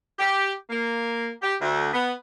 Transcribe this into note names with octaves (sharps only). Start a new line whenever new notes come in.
G4
A#3
G4
D2
B3